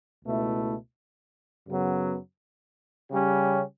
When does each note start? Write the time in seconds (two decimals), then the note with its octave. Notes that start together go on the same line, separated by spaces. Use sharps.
0.24 C#2 B2 A3 E4
1.68 F#2 C#3 F#3 B3
3.11 C#3 G3 C#4 G4